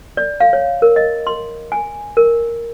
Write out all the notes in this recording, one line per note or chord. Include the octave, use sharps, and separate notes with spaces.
D5
F5
C#5
A#4
D#5
C6
G#5
A#4